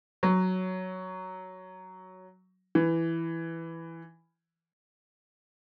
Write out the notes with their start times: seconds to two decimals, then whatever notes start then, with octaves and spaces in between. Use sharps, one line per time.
0.23 F#3
2.75 E3